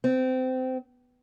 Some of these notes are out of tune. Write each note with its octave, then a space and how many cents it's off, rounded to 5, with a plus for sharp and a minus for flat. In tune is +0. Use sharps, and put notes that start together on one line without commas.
C4 -25